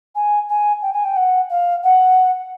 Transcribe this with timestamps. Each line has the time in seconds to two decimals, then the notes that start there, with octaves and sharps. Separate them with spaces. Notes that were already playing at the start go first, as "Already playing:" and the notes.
0.15 G#5
0.49 G#5
0.82 G5
0.93 G#5
1.04 G5
1.16 F#5
1.50 F5
1.83 F#5